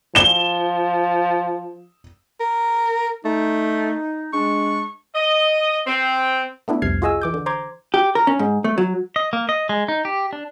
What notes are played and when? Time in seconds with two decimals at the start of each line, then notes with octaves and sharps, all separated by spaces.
0.15 F3 E7 G7
2.40 A#4
3.25 A3 D#4
4.33 G#3 D4 C#6
5.15 D#5
5.87 C4
6.68 A3 B3 D4 E4
6.82 C2 F2 C3 F6 G#6 C7
7.02 F4 F#4 G#4 D#5 G#5 E6
7.21 E3 D6 G6
7.34 D3
7.46 C5 A#5 C6 D6 G#6
7.94 G4
8.15 A#4
8.27 C#4
8.39 G#2
8.64 A3
8.78 F#3
9.16 D#5
9.33 A#3
9.49 D#5
9.69 G#3
9.88 D#4
10.05 G4
10.33 D4